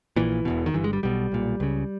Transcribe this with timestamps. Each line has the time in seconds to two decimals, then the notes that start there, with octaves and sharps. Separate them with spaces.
0.16 A#1 A#2 E3
0.45 E1 E2 B2
0.66 D#3
0.74 G1 G2 E3
0.84 G#3
0.93 G3
1.03 B1 B2 G3
1.32 B1 A#2
1.60 C#2 C#3